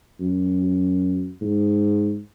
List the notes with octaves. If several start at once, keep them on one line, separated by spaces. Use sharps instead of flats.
F#2
G#2